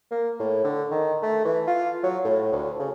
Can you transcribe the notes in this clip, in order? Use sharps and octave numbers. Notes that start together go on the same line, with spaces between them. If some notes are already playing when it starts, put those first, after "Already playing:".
A#3
A2
D3
D#3
A3
E3
F4
F#3
A2
D2
C#3